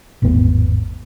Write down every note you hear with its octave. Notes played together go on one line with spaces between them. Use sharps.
G#1 E2 A2 B3